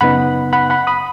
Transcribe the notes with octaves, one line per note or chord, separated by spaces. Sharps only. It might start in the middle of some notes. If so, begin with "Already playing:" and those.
F#2 C#3 B3 D#4 F#5 B5
F#5 B5
F#5 B5
B5 D#6